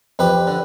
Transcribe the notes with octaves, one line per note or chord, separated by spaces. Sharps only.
F2 G4 B4
D3